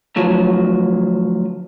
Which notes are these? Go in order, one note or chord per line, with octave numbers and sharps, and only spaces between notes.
D2 F3 F#3